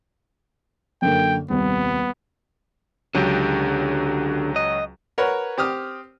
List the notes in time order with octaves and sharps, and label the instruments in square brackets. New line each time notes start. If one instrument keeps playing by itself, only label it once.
[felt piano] F#2 D3 A#3 [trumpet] G5
[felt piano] D#1 C2 [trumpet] B3
[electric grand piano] C#2 F#3 [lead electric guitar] D3 G4
[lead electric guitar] D#5
[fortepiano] F#4 A#4 B4 C#5 F#5
C4 G4 D#6 F6